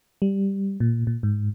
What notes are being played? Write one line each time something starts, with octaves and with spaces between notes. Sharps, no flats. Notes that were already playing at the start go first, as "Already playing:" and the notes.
G3
A#2
A#2
G#2